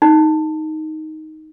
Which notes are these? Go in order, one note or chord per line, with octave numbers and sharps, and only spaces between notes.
D#4